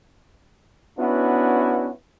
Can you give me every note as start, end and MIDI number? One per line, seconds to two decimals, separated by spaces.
0.99 1.89 59
0.99 1.89 61
0.99 1.89 62
0.99 1.89 64
0.99 1.89 66